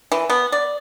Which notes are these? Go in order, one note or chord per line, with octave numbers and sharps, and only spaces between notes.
E3
B3
D5